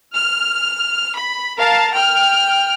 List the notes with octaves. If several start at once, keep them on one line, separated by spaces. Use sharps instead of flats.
F6
B5
A#4 F5 A5
G5 F6